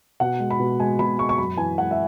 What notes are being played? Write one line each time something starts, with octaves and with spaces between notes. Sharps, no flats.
B2 F#5
G#3
B5
B2
G#3 G#5
B2 B5
G#3 C#6
C#6
F#2 B5
E3 G#5
G#3 F#5
E5